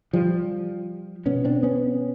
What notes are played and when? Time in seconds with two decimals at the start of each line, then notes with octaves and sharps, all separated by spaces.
0.13 F3 G3
1.26 B2 B3 C#4
1.45 C4 D4
1.63 B3 C#4